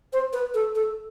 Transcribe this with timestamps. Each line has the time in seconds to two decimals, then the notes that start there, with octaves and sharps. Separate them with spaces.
0.13 C5
0.33 B4
0.54 A4
0.75 A4